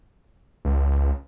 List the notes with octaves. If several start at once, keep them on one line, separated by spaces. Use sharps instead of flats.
C#2